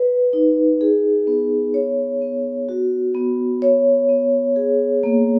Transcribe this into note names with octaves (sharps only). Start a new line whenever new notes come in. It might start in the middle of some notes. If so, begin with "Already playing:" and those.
Already playing: B4
D#4
G#4
B3
C#5
B3
F#4
B3
C#5
B3
G#4
A#3